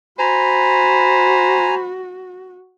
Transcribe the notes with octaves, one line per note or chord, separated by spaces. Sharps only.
F#4 C5 G#5 A#5 B5